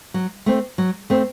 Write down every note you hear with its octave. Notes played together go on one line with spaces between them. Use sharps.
F#3
A3 C4
F#3
A3 C4